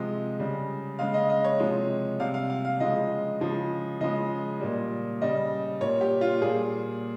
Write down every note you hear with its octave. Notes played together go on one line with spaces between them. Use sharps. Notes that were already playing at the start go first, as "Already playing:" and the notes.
Already playing: C3 F3 G#3 D#5
C#3 G3
C#3 G#3 F5
D#5
D#5
C#5
C3 F3 G#3
C3 G3 F5
F5
F5
F5
C#3 F3 G#3 D#5
C#3 F3 G#3
C#3 F3 G#3 D#5
A#2 G3
C#3 G3 D#5
A#2 G3 C#5
G4
F4
A#2 G3 G#4